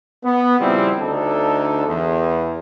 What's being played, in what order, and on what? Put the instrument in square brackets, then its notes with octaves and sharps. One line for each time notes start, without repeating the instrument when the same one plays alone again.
[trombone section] B3
A#2 C#3 F3 G3 C4 E4
D2 D3 D#4 A4
E2